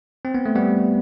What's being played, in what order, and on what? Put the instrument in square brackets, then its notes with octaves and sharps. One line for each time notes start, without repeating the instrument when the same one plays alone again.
[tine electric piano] C4
B3
A3
G3 B3